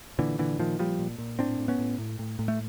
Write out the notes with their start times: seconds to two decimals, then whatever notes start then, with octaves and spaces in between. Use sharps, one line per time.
0.19 A#2 D3 E3
0.38 A#2 D3 E3
0.59 A#2 D#3 F3
0.79 A#2 F3 G3
0.99 A#2
1.18 A#2
1.39 A2 C4 D4
1.59 A2
1.68 B3 C#4
1.79 A2
1.98 A2
2.19 A2
2.39 A2
2.48 A3